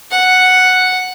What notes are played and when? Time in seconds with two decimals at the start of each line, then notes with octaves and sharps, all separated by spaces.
0.11 F#5